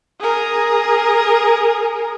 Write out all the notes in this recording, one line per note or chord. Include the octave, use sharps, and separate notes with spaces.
G#4 A#4